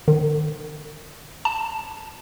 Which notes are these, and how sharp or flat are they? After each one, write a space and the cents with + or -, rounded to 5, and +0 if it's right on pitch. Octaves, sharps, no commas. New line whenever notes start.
D#3 -35
A5 +5